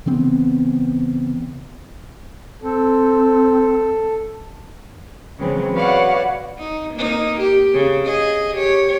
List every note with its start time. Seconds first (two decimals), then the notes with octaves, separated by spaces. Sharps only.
0.06 C#3 E3 B3 C4
2.62 C4 A4
5.38 C#3 E3 F#3 G#3 B3 C4
5.74 F#4 B4 C#5 D5 F5 F#5
6.59 D#4
6.94 A#3 D#4
7.40 G4
7.74 C#3
8.05 G#4 D#5
8.55 G4 C#5